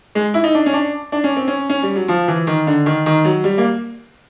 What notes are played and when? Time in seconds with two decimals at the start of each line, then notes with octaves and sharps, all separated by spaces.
0.15 G#3
0.34 E4
0.44 D#4
0.55 D4
0.66 C#4
0.73 D4
1.12 D4
1.24 C#4
1.37 C4
1.48 C#4
1.70 C#4
1.83 G3
1.96 F#3
2.08 F3
2.28 E3
2.47 D#3
2.67 D3
2.86 D#3
3.06 D#3
3.25 F#3
3.44 G3
3.58 A#3